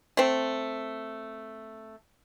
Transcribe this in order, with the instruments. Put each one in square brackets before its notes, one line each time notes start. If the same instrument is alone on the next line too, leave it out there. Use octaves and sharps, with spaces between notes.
[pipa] A3 C4